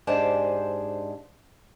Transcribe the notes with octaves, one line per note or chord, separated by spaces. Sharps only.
G#2 D4 G4 G#4 C5 A5